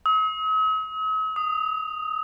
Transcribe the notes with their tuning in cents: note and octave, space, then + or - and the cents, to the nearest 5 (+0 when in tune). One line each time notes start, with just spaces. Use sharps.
D#6 +45
D#6 -5